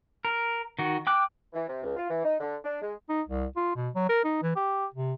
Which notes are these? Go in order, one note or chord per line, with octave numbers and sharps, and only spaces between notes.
A#4
D#3 F#4
G5 D6 F#6
E3
C3
C#2
F4
E3
D#4
D3
D4
G#3
D#4
C2
F4
B2
F#3
A#4
D#4
E3
G4
C3